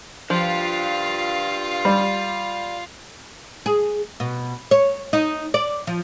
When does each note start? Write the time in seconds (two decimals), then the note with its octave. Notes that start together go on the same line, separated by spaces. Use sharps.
0.30 F3 D4 F4 G4 F5
1.85 G3
3.66 G#4
4.20 B2
4.71 C#5
5.13 D#4
5.54 D5
5.87 F3